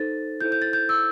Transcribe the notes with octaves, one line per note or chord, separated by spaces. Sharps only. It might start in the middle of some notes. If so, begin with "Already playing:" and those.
Already playing: D#4 A4 C5 A6
E4 A4 C5 G6
G6
A6
G6
E6